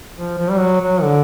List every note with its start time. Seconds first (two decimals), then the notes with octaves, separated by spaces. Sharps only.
0.18 F3
0.38 F3
0.51 G3
0.60 F#3
0.81 F#3
1.02 D3